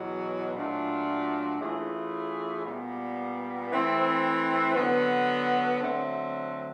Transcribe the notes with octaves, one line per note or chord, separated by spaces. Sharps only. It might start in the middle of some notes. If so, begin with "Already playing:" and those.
Already playing: E2 B2 F#3
A#2 F#3 A3 D4 F4
E3 A3 C#4 F4 G#4
A#2 G3 B3
E3 A3 C4
D3 F#3 B3
D3 F#3 A3 C4